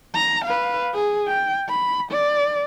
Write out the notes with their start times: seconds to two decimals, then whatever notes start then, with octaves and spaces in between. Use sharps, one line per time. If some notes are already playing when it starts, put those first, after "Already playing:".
0.14 A#5
0.45 B4 F5
0.95 G#4
1.28 G5
1.69 B5
2.11 D5